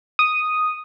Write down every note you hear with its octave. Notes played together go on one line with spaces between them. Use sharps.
D#6